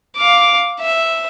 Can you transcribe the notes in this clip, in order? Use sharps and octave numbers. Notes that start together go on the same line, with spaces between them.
F5 D6
E5